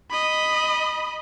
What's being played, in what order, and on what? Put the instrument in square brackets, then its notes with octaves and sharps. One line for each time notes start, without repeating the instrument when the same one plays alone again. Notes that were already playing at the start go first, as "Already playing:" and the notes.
[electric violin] D#5 B5